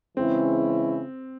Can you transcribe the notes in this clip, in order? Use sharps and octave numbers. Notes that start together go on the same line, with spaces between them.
C#3 E3 G#3 C4 C#4 E4